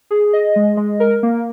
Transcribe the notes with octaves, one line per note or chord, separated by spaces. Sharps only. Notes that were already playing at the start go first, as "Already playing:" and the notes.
G#4
D#5
G#3
G#3
A#4
A#3